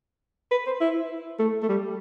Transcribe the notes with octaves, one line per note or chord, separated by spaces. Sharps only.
B4
C5
E4
A3
A3
G3